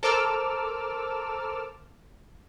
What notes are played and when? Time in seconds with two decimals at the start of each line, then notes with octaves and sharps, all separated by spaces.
0.03 A4 A#4 C5 D6 E6 F6